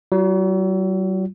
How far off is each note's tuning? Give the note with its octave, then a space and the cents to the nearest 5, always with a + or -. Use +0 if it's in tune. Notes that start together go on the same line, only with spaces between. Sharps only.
F#3 +45 F4 +0